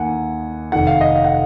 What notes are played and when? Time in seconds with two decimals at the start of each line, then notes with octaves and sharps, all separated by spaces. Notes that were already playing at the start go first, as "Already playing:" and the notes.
Already playing: D#2 D#3 A#3 D#4 F#5 G#5
0.72 F1 F2 D#3 F#5
0.87 F5
1.01 D#5
1.16 F5
1.24 F#5